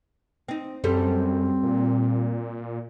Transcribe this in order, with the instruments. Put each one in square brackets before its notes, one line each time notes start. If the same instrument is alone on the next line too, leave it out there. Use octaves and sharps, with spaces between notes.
[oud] C4 D#4
[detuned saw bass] F#2 [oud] G3 A4 C5 [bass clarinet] C4
[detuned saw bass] A#2